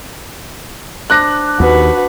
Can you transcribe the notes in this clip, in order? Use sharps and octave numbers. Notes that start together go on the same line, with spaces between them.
D4 C5 F#6 A#6
D#2 F#4 B4